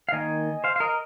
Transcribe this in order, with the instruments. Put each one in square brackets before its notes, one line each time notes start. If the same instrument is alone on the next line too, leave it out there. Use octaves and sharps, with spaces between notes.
[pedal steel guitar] F5
D#3 A#3 D#5 G#5
C5 F5
F5
A#4 D#5